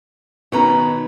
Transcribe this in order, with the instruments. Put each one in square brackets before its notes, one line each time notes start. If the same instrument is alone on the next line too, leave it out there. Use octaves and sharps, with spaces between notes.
[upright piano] B2 D#3 [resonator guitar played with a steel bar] C#4 B4 A#5